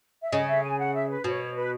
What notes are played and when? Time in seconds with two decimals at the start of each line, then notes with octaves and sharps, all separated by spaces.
0.22 E5
0.31 C#3 D#5
0.47 E5
0.62 G#5
0.78 F#5
0.94 E5
1.09 B4
1.24 B2 C#5
1.55 B4